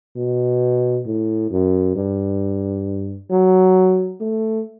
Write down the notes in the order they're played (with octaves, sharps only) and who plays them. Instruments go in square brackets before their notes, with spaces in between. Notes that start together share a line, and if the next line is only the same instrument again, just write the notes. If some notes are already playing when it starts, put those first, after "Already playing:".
[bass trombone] B2
A2
F#2
G2
F#3
A3